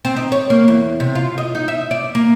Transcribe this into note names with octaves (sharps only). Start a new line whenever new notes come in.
C4
D#4
C#5
A#3
E2
C3
F4
D#5
D#4
E5
D5
A#3